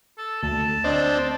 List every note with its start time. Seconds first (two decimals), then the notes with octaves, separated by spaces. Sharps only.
0.18 A4
0.43 D2 A5
0.84 C4 D4 D#5